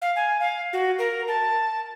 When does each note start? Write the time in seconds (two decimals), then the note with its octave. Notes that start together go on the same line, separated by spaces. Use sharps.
0.02 F5
0.16 G#5
0.40 F5
0.73 F#4
0.99 A#4
1.28 A5